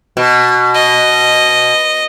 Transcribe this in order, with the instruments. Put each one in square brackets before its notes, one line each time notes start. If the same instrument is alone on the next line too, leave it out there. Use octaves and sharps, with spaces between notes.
[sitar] B2
[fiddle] D#5